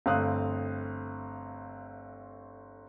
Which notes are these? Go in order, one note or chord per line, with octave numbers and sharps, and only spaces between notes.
G1 A3 C4 F5 D#6 F#6